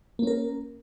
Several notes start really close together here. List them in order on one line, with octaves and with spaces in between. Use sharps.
A#3 C#4 A#4